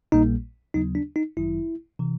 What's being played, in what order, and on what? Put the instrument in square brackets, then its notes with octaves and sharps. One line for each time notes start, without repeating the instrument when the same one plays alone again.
[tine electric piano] A#1 A#2 G3 A#3 D#4
D#2 C#3 F#3 B3 D#4
D4
D#4
G1 F#2 D#3 F#3 E4
C3 E3